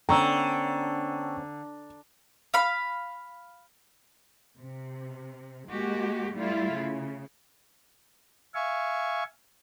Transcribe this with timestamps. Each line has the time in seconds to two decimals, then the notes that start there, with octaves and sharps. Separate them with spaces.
0.09 D3 B3 C#4 C5 G5 A#5 C#6 E6
2.54 F5 B5
4.61 C3
5.70 G#3 A#3 F#4 G4
6.36 G3 A3 E4 F4
6.74 C#3
8.54 E5 F5 G#5 C#6